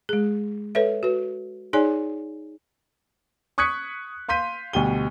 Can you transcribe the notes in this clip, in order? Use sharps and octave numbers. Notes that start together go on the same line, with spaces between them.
G#3 G#4
A4 B4 C#5 E5
F#4 B4
D#4 G#4 C#5 D5 G#5
C#6 D#6 F#6 G#6 B6 C#7
F5 C6 G6 B6 D#7
D2 B2 G3 G5 D#7 G7